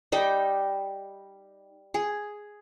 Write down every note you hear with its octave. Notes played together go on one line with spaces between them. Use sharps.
G3 D#4 G5 D6
G#4